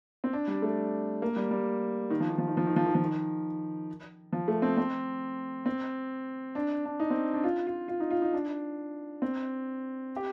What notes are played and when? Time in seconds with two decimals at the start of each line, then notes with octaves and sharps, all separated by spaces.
0.24 C4
0.33 D4
0.48 G3
0.62 A3
1.22 A#3
1.36 G3
1.51 G3
2.10 D#3
2.20 F3
2.30 D#3
2.38 F3
2.48 D#3
2.57 F3
2.67 D#3
2.76 F3
2.86 D#3
2.95 F3
3.04 D#3
4.33 F3
4.48 A3
4.62 C4
4.77 C4
5.66 C4
6.55 D4
6.85 D4
7.00 D#4
7.10 C4
7.34 D4
7.44 F4
7.67 F4
7.88 F4
8.00 D#4
8.11 F4
8.22 D#4
8.33 D4
9.22 C4
10.16 G4